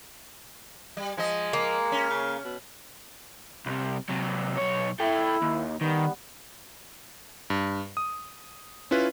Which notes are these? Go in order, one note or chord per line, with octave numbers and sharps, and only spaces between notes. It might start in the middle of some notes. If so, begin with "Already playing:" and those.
G3
F3 G#3 D#5
A#3
C#4
C#3
B2
C2 C3
C3 F#3
B1 C#5
E4 A4 G5
D#2
D#3 G3 B3
G2
D#6
C#4 E4 F4 B4